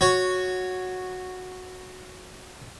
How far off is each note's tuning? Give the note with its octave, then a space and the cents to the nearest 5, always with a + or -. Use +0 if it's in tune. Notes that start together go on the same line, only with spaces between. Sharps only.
F#4 -10 C#5 +0